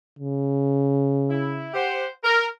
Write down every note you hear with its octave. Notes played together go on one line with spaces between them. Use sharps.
C#3
E4
G4 C5 F#5
A#4